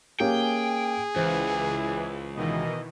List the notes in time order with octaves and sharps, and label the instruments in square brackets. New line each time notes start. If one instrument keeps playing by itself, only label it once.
[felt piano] A#3 C#4 G4 [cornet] G#4 [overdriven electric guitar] G5
[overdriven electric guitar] C#2 [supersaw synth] E3 [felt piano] C5
[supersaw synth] B2 D#3 E3 [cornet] D#5